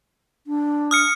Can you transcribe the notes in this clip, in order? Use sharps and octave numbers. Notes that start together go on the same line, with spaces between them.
D4
D#6 F6 C#7